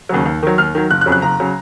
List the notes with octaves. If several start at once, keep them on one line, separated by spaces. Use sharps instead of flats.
D#2 C#3 F#3
D#2
D#3 F#3
D#2 F6
D#3 F#3
F#1 F#6
F#6
F2 C#3 F#3
F#6
F#1 A#5
C#3 F#3